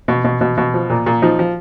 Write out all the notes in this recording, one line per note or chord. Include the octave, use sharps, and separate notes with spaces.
B2
B2
B2
B2
F3
A#2
A#2
F3 D#4
F3